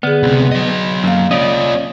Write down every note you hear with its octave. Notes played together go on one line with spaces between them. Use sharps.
D3 B3 G#4
C#2 C3
F#3 D#5
F#2 A#3 F5
C#4 F4 D5 D#5